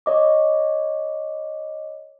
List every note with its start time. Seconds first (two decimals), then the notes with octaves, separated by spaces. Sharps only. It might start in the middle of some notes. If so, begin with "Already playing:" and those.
0.06 C#5 D#5 D6